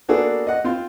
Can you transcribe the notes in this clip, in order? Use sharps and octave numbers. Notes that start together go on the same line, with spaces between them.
A#3 B3 D4 F#4 G#4 A4
D#5 F#5
C4 F4